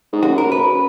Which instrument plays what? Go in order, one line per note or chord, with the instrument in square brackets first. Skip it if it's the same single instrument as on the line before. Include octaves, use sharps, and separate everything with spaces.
[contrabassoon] G#2
[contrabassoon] F#2 [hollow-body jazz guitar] F#4
[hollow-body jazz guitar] A#4
B4